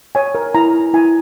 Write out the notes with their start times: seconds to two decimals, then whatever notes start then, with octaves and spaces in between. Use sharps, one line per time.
0.15 C#5 G#5
0.35 A#4
0.55 E4 A#5
0.74 E4
0.94 E4 G#5